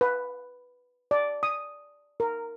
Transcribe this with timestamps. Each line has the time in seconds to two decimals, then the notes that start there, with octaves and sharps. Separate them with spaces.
0.01 B4
1.11 D5
1.43 D#6
2.20 A#4